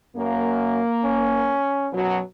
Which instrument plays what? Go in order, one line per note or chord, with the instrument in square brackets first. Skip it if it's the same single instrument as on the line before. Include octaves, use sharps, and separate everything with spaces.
[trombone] F#2 [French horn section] A#3
[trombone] C#4
[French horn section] F#2 B2 F#3